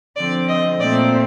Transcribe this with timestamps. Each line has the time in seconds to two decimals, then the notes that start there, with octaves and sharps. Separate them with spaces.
0.17 D3 F3 C4 D5
0.49 D#5
0.80 A#2 A3 C4 D5